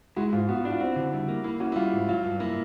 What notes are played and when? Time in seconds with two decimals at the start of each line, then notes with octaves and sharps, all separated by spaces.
0.16 G#3 E4 F#4
0.33 G#2 F4
0.49 B3 F#4
0.56 F4
0.64 D4 E4
0.71 F4
0.80 C4 E4 F#4
0.96 D3
1.12 G3 E4
1.29 A#3
1.44 A#3 E4
1.60 C#4 E4 F#4
1.72 E4
1.76 G3 F4
1.93 G#2
2.09 F#3 F4
2.25 G2
2.40 A#3 E4